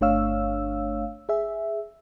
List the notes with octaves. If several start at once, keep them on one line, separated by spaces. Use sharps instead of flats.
G1 A3 D4 C#5 F5 E6
G#4 E5